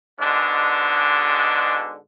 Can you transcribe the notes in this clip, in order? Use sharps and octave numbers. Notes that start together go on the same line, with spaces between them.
G#2 B2 D3 G#3 D4